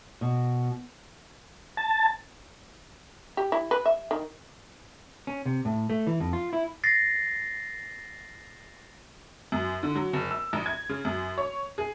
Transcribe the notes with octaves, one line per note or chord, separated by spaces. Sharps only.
B2
A5
G4
E4
B4
E5
D#3
C#4
C3
A2
A3
E3
F2
F4
E4
A6 A#6 C7
F#2
D3
F#3
F#1
E6
A#1
G#6
C#3
F#2
C#5
G#4